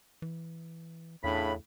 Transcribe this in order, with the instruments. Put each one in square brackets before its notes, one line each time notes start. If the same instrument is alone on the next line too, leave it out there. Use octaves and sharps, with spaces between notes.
[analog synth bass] E3
[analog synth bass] E2 [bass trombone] A2 [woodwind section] C#3 D4 B5